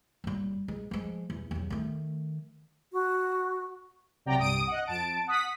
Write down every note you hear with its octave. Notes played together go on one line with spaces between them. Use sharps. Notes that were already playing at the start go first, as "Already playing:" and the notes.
F#1 G3
G#3
F3 G#3
E2
E2 F#3
D#3 A3
F#4
C2 C3 F#3 D5 G5 A#5
C2 G2 D#6 D7
D#5 F#5
F2 A5 D7
F#5 D#6 B6